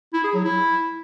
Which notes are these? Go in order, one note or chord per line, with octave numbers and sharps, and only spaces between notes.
E4
G#4
F#3
E4